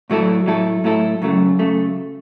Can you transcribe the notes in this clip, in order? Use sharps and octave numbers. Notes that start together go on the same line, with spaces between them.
A2 F#3 A3 E4 A4
A2 F#3 A3 E4 A4
A2 F#3 A3 E4 A4
F#2 C#3 F#3 A3
C#3 F#3 A3